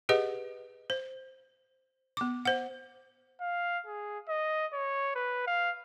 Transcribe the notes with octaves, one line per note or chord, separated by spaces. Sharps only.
G4 G#4 B4 D#5 F#5
C5
B3 D6
C5 F#5
F5
G#4
D#5
C#5
B4
F5